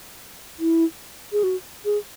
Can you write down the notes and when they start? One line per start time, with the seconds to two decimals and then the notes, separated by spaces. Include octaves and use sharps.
0.59 E4
1.32 G#4
1.43 F#4
1.85 G#4